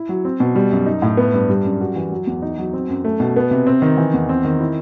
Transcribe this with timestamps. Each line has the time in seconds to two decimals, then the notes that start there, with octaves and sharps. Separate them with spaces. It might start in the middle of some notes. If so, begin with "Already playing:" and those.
Already playing: E4
0.09 F#3
0.25 C4
0.40 B2
0.56 G3
0.71 F#2
0.86 D#4
1.02 A2
1.17 B3
1.34 G2
1.50 G3
1.65 F#2
1.81 F#4
1.96 E3
2.12 F#3
2.27 E2
2.42 D#4
2.58 F#3
2.73 C4
2.89 F#2
3.05 A3
3.20 B2
3.36 B3
3.51 C3
3.67 C4
3.82 D#3
3.98 E3
4.13 E2
4.29 C4
4.44 D#3
4.60 E4